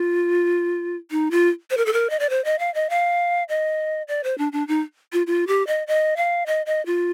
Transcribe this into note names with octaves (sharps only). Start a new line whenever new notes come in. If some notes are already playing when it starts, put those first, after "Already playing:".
Already playing: F4
D#4
F4
C5
A#4
A4
A#4
D#5
D5
C5
D#5
F5
D#5
F5
D#5
D5
C5
D4
D4
D#4
F4
F4
G4
D#5
D#5
F5
D#5
D#5
F4